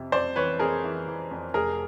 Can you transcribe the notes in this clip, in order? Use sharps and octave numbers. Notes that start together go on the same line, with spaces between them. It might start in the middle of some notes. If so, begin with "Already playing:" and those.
Already playing: F2 C3
F2 C5 D5
E3 B4 C#5
F2 G#4 A#4
E3
E3
F2
F1 G#4 A#4